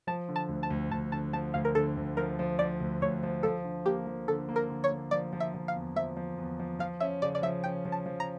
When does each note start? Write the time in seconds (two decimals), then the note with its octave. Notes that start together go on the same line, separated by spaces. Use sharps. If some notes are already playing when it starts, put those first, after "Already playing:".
0.07 F3 A5
0.29 D3
0.36 A5
0.49 D2
0.63 A5
0.70 D2
0.91 D2 A5
1.12 D3 A5
1.33 F3 A5
1.54 D2 F5
1.65 A#4
1.75 D3 A4
1.97 D2
2.17 F3 A#4
2.39 F3
2.59 F3 D5
2.80 D2
3.02 D2 C#5
3.23 F3
3.43 F3 A4
3.64 D3
3.85 A#3 G4
4.07 F3
4.28 D3 A4
4.49 A#3
4.56 A#4
4.70 D3
4.84 C#5
4.91 A#3
5.11 F3 D5
5.33 F3
5.40 E5
5.54 F3
5.68 F5
5.75 E2
5.96 F3 E5
6.17 F3
6.38 E2
6.60 F3
6.79 F3 F5
7.00 C#4 E5
7.22 C#3 D5
7.35 D5
7.42 F3 E5
7.64 C#4 G5
7.85 F3
7.92 A5
8.06 F3
8.20 A#5